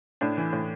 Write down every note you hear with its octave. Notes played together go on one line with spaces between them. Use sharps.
A2 D4
E3
A2